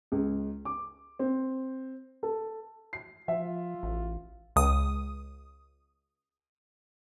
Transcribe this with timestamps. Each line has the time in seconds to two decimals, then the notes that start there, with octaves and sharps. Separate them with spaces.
0.12 C#2
0.65 D6
1.19 C4
2.23 A4
2.93 C7
3.28 F3 F4 E5
3.83 A1
4.56 C#2 D#6